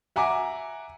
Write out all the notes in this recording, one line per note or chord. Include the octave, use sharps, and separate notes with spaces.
E5 F#5 G#5 A#5 D6